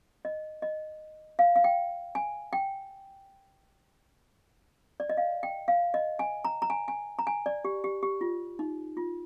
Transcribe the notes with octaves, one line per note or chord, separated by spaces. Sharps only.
D#5
D#5
F5
F5
G5
G#5
G5
D5
D#5
F5
G5
F5
D#5
G#5
A#5
A#5
G#5
G#5
A#5
G#5
D5
G4
G4
G4
F4
D#4
F4